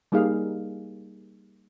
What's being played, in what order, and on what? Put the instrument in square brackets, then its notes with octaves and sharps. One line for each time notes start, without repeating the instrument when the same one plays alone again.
[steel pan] G3 A#3 D#4 G#4 F5